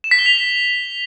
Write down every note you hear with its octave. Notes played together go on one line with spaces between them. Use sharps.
E7
B6
G7
F7